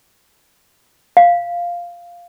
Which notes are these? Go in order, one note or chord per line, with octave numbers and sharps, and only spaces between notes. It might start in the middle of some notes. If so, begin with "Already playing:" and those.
F5